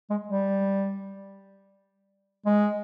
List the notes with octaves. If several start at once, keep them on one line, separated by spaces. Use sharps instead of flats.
G#3
G3
G#3